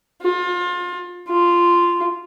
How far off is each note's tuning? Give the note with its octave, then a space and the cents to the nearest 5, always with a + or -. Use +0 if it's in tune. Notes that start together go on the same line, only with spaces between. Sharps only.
F4 +30
F4 -10